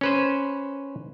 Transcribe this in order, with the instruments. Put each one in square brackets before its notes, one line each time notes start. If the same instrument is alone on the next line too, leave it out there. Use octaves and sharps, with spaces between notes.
[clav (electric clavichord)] C#4 B4 C5